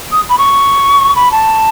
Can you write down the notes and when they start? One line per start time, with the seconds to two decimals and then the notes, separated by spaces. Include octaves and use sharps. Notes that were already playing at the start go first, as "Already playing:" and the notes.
0.12 D#6
0.29 B5
0.38 C#6
1.16 B5
1.32 A5